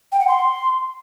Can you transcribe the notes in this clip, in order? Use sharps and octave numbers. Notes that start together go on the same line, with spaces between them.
G5
F#5
C6